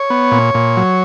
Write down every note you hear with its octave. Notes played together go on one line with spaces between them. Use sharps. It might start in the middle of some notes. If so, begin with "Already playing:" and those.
Already playing: C#5
B3
A#2
A#2
F#3